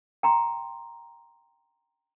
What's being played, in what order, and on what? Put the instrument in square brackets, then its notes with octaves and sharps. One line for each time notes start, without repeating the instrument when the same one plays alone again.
[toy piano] G5 A#5 C6